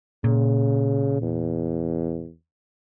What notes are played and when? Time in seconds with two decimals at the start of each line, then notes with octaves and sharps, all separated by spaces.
0.24 A#2 C#3
1.22 E2